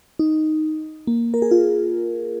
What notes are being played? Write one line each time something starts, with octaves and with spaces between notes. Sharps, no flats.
D#4
A#3
A#4
G#4
F4